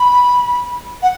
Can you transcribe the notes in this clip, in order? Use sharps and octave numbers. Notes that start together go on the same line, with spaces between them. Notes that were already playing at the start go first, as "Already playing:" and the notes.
Already playing: B5
F#5